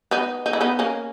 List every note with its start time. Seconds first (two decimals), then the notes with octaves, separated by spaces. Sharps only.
0.11 B3 D#4
0.46 D#4
0.53 E4
0.61 B3 D#4
0.79 A#3 C#4